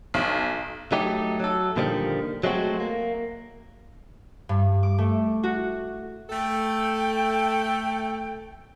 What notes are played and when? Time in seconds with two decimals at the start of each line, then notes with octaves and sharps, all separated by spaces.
0.14 B1
0.92 F#3 A3 D#4 G4
1.40 F#3 A4
1.76 A#2 D3 D#3 F3 G3
2.44 F#3 G#3 A3 C4 F#4
2.80 A#3
4.49 G2
4.83 D6
4.98 A3
5.43 F#4
6.30 A3 A4 G5